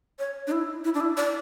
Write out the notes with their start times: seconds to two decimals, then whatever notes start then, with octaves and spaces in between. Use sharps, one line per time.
0.19 C#5
0.47 D4
0.52 E4
0.84 E4
0.94 D4
1.01 E4
1.17 D5